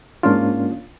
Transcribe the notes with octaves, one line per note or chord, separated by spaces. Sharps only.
G#2 A#3 C#4 D4 F4